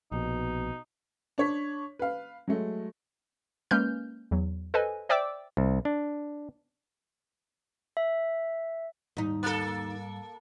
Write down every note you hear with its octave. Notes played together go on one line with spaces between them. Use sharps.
A#1 B2 D#4
D4 C#5 B6
B4 F5
F#3 G#3 A3
G#3 A#3 C#4 B4 F6 G6
E2 F#3
A4 B4 C5 D#5 G#5
C5 D5 E5 G5 D6 E6
C2
D4
E5
D#2 G#2 G3 D#4
A#3 A4